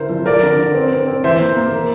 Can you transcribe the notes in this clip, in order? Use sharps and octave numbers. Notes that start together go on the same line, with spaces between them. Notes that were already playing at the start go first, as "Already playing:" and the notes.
Already playing: D3 E4 A#4 C5
F3
F3 A#4 D5
D3
D3
C4
C4
C4
E3 C5 E5
A#3
A#3
A#4